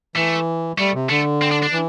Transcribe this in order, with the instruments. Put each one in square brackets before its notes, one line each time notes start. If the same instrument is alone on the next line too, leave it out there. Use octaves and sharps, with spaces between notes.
[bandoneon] E3 [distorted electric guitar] A3
[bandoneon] G3 [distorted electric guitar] A3
[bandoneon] C3
[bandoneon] D3 [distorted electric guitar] A3
[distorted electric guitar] C4
D4
D4
[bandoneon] E3